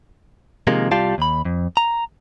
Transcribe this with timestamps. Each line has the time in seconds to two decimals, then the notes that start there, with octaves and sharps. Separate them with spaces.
0.67 C3 D#3 F3 G#3 A#3
0.91 C2 G3 F4 G4 F5 A5
1.18 D#2 B5
1.45 F2
1.77 A#5